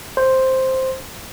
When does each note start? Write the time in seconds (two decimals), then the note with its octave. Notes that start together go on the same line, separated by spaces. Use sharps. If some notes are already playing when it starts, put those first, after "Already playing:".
0.17 C5